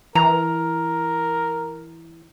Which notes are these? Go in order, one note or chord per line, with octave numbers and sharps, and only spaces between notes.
E3 A#4 A#5